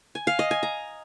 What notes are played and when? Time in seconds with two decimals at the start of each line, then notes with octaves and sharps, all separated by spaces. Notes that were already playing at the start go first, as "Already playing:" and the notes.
0.15 G#5
0.27 F5
0.39 D#5
0.51 G#5
0.63 A#5